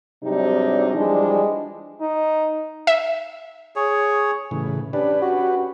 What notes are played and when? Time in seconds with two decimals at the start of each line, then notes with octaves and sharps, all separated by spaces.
0.24 G#2 C3 F#3 G3 D4 D#4
0.95 E3 F3 G3 G#3 D4
2.01 D#4
2.87 E5
3.76 G#4 C#5
4.51 A2 C#3 E3
4.93 C#4 D4 G4 B4
5.22 F#4